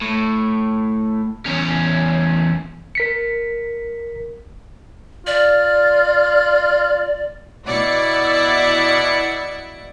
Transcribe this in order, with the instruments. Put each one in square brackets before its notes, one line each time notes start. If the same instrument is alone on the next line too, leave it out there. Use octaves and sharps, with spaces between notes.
[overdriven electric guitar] A2
E2 C#4
[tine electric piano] A#4 B6 C#7
[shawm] F4 [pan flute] D5
[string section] B2 E4 D5 E5 F#5 C#7